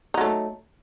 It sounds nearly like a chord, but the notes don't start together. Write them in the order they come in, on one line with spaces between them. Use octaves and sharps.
D#4 F#3 A3